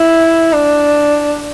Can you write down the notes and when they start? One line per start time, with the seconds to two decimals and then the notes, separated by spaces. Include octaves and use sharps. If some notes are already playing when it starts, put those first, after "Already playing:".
Already playing: E4
0.53 D4